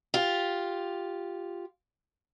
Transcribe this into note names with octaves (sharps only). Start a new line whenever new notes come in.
F4 G4